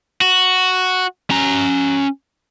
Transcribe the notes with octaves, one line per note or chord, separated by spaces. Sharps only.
F#4
C#4 A#5